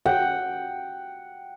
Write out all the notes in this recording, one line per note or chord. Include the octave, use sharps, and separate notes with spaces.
F#5 G5